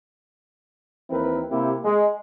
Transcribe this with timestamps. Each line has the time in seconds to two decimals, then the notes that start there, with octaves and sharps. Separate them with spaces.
1.10 D#2 E3 C4 E4 A#4 B4
1.51 C3 A#3 C4 E4 G4
1.84 G#3